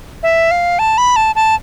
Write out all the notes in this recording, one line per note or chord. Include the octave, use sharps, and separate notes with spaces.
E5
F5
A5
B5
A5
A5